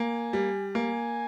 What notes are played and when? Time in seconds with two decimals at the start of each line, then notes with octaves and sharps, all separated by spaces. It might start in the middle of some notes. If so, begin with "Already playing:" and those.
Already playing: A#3 G#5
0.33 G3
0.75 A#3 G#5